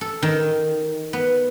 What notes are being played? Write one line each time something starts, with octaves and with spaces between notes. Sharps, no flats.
A4
D#3
B3